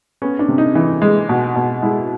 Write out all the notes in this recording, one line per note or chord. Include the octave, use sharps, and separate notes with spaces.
B3 C#4
D4
C3
D#4
E3
G#3
B2
B2
G#3 E4